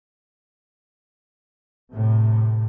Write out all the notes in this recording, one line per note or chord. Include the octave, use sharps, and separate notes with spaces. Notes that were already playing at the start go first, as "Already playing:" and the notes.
A2 C3